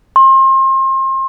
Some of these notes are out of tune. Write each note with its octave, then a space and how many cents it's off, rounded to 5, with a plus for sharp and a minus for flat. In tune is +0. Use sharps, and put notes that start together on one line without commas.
C6 +35